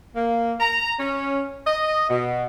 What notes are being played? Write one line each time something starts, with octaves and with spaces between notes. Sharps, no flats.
A#3
A#5
C#4
D#5
B2